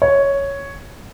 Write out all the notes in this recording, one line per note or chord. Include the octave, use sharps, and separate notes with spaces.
C#5